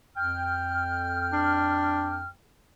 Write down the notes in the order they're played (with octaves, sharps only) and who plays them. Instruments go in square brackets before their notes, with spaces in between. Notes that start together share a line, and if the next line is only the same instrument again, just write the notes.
[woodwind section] F2 G5 F6
[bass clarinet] D4